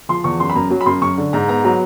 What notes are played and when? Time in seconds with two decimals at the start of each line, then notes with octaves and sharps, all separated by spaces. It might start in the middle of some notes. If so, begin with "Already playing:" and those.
0.09 F3 C6
0.24 E2 C#6
0.40 F#2 C6
0.49 B5
0.55 F#2 A#5
0.70 F#3
0.81 B5
0.86 F#2 C6
1.01 F#2 C#6
1.18 D3
1.33 G#2 A#5
1.48 B3 A#5
1.64 F#3 A#5